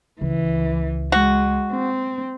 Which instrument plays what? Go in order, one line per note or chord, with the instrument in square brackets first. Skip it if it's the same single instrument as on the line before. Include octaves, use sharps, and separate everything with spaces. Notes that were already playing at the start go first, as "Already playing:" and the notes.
[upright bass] C#2 [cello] E3
[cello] G#3 [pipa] F#4
[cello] C4